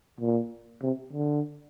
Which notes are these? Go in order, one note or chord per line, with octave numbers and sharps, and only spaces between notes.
A#2
C3
D3